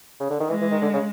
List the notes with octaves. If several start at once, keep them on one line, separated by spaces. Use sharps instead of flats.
C#3
D3
D#3
E3 G#3
E3
D#3
D3
C#3